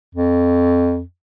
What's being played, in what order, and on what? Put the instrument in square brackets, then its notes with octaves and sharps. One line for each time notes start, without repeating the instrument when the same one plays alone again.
[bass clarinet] F2